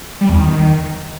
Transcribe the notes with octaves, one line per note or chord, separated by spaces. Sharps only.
G3
E2
D#3